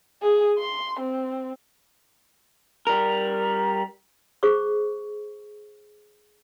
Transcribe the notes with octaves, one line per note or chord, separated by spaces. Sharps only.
G#4
C6
C4
G3 A#4
G#4 C5 C#6